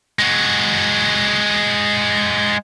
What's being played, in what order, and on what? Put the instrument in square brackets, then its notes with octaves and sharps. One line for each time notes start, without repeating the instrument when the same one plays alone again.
[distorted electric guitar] G#3 F#4